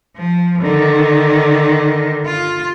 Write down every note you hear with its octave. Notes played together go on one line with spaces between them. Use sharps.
F3
D3 D#3
F4